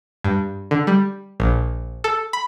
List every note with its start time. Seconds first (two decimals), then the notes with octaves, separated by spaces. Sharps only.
0.24 G2
0.71 D3
0.87 G3
1.40 A#1
2.04 A4
2.33 B5